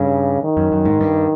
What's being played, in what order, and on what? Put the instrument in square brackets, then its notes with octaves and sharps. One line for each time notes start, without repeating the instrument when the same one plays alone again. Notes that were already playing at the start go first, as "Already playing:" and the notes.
Already playing: [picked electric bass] G2 [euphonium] C#3
[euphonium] D#3
[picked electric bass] F#2
F#2
G#2
G2